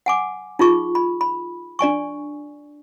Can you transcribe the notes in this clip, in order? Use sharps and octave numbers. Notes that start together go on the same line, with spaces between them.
F#5 G#5 D6
D#4 F4 G#4 C#6
B5
B5
D4 D5 G#5 C#6